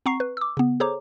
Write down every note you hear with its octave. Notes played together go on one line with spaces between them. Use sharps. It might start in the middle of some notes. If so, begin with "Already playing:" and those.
C4 F#5 A#5 C#6 C7
B4
D6 E6
C#3 B3
G#4 A4 C5 C#5 A#5 D6